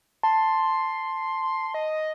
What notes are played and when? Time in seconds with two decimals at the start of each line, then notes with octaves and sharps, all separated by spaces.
0.23 A5 C6
1.74 D#5